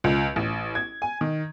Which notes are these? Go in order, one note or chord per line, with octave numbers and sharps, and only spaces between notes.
C#2
A1
G#6
G#5
D#3